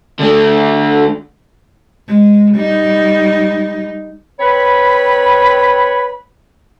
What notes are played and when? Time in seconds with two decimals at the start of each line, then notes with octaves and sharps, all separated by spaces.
0.20 D3 A3
2.08 G#3
2.55 G3 D#4
4.40 C4 B4 C#5 B5